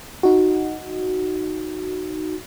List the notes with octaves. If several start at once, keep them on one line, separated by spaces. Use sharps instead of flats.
D#4 F#4